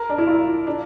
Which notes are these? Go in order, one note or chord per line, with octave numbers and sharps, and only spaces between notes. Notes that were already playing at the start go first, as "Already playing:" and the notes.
Already playing: A#4
D4
E4
F4
D4